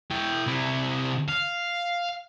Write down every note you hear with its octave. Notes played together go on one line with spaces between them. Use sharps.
E4 G5
C3 E4
F5